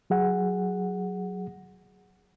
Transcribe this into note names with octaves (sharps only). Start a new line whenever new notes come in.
F#3 G#4 F#5